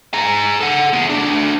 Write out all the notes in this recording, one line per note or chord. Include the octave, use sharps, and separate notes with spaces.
G#4 A#5
A4 F#5
B3 G#4
A3 D4